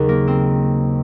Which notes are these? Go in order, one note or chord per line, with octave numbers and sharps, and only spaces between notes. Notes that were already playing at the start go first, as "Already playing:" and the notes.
Already playing: D#2 C#3 F#3
A#3
C4